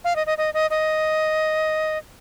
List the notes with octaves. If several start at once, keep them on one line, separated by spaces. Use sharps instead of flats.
F5
D#5
D#5
D#5
D#5
D#5